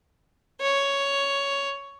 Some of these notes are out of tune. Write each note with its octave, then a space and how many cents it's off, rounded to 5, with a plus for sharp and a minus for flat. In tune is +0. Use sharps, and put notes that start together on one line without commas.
C#5 +5